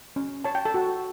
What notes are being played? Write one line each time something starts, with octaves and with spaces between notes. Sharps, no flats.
C#4
C#5 A5
G5
A4 A5
F#4